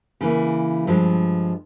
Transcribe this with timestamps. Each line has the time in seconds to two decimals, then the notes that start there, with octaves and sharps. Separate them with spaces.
0.21 C#3 E3 A#3 E4
0.87 G2 F3 G#3